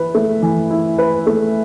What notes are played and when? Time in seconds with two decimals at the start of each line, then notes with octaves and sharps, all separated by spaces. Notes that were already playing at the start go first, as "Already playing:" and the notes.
Already playing: E3 E4 B4
0.15 A3
0.42 E3
0.71 E4
0.98 B4
1.27 A3